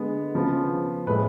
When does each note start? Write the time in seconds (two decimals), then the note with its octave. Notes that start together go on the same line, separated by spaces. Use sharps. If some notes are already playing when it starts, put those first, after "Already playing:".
Already playing: D3 G#3 B3
0.35 C#3 F3 B3
1.07 A2 G#3 B3 B4